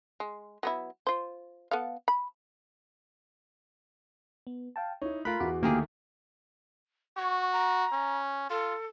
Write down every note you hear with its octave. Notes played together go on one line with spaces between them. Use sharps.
G#3
F#3 B3 E4
F4 C5
B3 A4 F5
B5
B3
F5 G5 A5
D#4 E4 C#5
A3 F4 A#4 B5 F#6
E2 E4 F#4 D6
D2 D#3 A3 A#3 G4 G#4
F#4 C#6
A#5
C#4
F4 A4